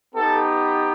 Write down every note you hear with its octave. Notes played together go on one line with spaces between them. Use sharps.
B3 D#4 G4 A4